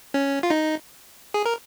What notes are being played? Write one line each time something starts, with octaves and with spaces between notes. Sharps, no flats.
C#4
F4
D#4
G#4
A#4